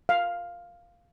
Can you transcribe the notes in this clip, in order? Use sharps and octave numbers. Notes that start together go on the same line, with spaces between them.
F5